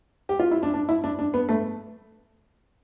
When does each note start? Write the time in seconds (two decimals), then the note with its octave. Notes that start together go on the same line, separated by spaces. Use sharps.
0.29 G4
0.39 F4
0.51 E4
0.63 D4
0.74 D4
0.89 E4
1.04 D4
1.19 D4
1.34 B3
1.49 A3